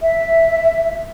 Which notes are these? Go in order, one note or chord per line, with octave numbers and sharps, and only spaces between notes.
E5